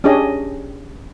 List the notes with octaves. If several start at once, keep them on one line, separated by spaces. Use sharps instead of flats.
C#4 D4 G4 G#4 D#5